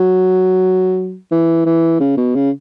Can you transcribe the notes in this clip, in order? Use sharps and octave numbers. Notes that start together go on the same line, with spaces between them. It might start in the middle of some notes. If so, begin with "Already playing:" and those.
Already playing: F#3
E3
E3
C#3
B2
C#3